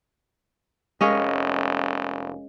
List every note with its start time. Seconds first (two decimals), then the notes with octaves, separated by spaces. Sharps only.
1.01 F1 G#3 C#4 A#4 D#5 F5 G#5